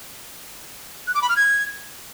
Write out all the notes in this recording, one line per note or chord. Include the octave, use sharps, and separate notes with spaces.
F#6
D6
B5
F6
G#6